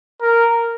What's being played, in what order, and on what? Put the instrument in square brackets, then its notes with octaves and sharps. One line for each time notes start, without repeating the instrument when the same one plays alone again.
[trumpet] A#4